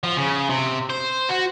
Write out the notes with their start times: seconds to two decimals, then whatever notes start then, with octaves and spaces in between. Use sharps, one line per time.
0.04 F3
0.17 C#3
0.50 C3
0.90 C5
1.30 F#4